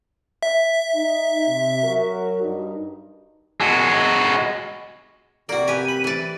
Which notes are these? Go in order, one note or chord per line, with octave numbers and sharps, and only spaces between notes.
E5
D#4
C3
F#3 F#4 A#4
G2 D#4
G#3 F#4
C3 A#3 C4 F#4 D5
G4 B4 G#5 D#7
B5
E3 D5